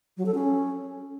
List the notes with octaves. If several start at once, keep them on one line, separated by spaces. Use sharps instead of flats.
F#3
A4
C#4